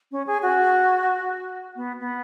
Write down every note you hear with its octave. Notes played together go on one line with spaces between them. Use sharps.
C#4
G#4
F#4
B3
B3